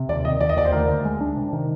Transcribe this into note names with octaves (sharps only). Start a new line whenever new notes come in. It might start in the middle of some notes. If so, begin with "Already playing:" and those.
Already playing: C3
D#2 D5
D#2 D#5
D#2 D5
D#5
D#2 D5
C5
D2 A#4
D2
G#3
D4
C3
D#3